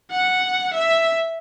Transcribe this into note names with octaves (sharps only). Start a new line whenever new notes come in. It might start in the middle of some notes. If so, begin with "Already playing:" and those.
F#5
E5